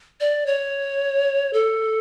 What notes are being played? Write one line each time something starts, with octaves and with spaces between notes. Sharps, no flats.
D5
C#5
A4